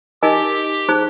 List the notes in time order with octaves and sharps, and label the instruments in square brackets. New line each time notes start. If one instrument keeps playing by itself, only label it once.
[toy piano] D#4 A#4 D#5 G#5 [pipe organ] G4
[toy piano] D#4 G#4 C5